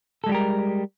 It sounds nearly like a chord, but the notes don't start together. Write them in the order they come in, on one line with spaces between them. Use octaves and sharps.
A4 G#3 G3 G4 A#4